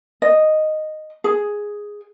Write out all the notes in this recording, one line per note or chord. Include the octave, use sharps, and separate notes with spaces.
D#5
G#4